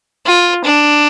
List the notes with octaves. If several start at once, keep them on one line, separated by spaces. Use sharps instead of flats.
F4
D4